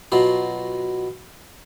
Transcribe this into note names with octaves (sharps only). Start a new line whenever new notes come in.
B2 F#3 F4